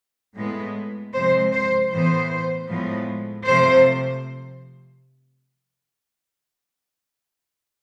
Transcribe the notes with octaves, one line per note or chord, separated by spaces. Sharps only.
A2 G#3 B3
C3 F3 G#3 C5
C5
A2 E3 B3 C5
A2 F3 G#3 B3
C3 F3 A3 C5